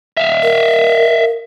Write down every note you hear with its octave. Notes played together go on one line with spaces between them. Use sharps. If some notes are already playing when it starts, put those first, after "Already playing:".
E5 F5
A#4